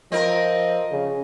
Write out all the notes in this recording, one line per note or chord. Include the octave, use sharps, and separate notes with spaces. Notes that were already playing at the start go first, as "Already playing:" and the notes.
F3 C4 A#4 D#5
C#3